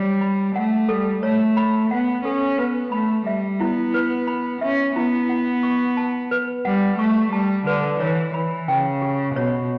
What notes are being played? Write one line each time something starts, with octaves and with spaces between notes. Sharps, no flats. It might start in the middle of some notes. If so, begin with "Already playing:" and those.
Already playing: G3 C#5
B5
A3 F#5
G3 A4
A3 C#5
B5
B3 F#5
C#4 A4
B3 B4
A3 B5
G3 E5
B3 E4
B4
B5
C#4 E5
B3 E4
F#5
C#6
A5
B4
G3 F#5
A3 C#6
G3 A5
D3 B4
E3 C#5
E3 B5
C#3 G5
G4
B2 C#5